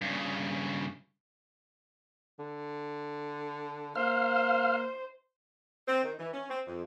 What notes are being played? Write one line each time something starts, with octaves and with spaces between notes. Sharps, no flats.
G2 C#3
D3
A#3 C5 F5 F6
C4
D#3
E3
C#4
C4
F2